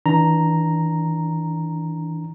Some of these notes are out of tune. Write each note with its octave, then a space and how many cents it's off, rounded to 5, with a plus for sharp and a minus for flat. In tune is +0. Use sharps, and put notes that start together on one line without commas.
E3 -30 D4 -5 A#5 +0